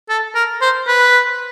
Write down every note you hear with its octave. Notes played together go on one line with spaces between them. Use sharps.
A4
A#4
C5
B4